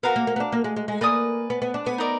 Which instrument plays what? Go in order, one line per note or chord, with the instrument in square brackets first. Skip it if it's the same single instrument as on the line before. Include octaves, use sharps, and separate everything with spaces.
[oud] B3 [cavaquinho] F#4 A#4 F5 A#5
[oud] A#3
A#3
B3
D4
A#3
G#3
G#3
G#3
[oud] A#3 [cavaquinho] B4 D5 G#5 D#6
[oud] B3
B3
D4
B3
[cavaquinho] D#4 A#4 D5